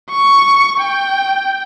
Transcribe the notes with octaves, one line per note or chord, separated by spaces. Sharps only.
C#6
G5